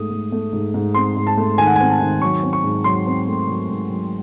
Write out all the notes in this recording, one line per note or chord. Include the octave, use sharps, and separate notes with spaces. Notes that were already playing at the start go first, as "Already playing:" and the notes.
Already playing: G#2 A3 D#6
A3
A3
G#2
G#2
C4 C6
G#2
A5
A3
D#3 G#5
F#5
G#5
C4
A5
D#3
F#3 C#6
C4
C#6
G#2
F#3 C6
C4
A3
F#3
G#2
F#3